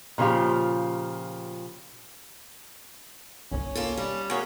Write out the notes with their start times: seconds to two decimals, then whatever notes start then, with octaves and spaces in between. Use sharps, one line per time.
0.18 A#2 C#3 F3 F4 G4
3.52 G1 C2 C#4
3.75 A#3 F4 A4
3.97 G3
4.31 A#3 C#4 F#4 G#4 C#5